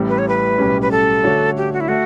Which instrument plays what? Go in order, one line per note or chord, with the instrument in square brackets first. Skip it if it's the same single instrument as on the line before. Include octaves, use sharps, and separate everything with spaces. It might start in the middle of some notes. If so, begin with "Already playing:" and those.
Already playing: [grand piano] A1 A2 G3
[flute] B4
C#5
B4
[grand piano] B1 A2 G3 C#4
[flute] B4
A4
[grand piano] D3 A3 D4 F#4 C#5
[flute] G4
F#4
E4
[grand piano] A3 [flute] F#4